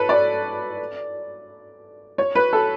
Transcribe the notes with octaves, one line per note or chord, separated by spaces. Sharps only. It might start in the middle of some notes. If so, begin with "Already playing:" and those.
Already playing: A4 B4 C#5
D5
C#5
B4
A4